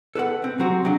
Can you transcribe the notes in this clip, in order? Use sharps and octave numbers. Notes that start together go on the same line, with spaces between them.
A4 B4 C#5 F#5
C4
F#3 C4 F#4 G4
C#3 F#3 D4